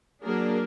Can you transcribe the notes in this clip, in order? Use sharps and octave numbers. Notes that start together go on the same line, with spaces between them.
F#3 A#3 D4 G#4 A#4